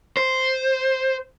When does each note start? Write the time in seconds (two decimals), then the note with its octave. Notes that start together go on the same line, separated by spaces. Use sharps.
0.17 C5